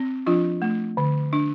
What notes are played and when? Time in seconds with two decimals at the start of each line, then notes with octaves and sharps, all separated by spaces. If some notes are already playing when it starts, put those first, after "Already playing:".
Already playing: C4
0.27 F3 D4 F4
0.62 A3
0.97 D3
1.33 D4